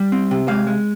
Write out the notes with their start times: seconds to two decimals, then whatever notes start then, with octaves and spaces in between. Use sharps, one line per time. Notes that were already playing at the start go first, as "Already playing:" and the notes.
Already playing: G3
0.12 C4
0.31 C3
0.48 G#3 F5
0.67 G#3